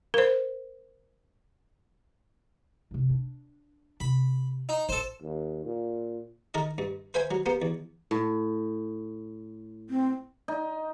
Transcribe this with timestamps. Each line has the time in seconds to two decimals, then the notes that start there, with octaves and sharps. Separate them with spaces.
0.14 A#4 C5
2.91 G2 C3
3.09 D4
4.00 C3 B5
4.69 D#4
4.89 A1 A4 C5
5.22 D#2
5.65 A#2
6.54 D#3 A4 A#4 D#5
6.78 G2
7.14 B4 C5 E5 G5 G#5
7.31 F#3
7.46 A#3 B3 G4
7.62 E2
8.11 A2
9.90 C4
10.48 D#4